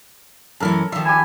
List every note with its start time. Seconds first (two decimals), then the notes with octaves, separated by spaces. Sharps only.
0.60 F#2 E3 C#4 A4 A#4
0.92 D#3 F3 E5
1.06 E4 G4 G#5